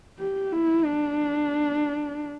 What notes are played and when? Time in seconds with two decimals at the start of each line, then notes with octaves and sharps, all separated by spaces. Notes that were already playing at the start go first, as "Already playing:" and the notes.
0.19 G4
0.52 E4
0.86 D4